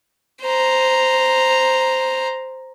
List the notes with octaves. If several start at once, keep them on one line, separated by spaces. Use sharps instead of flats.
C5 A#5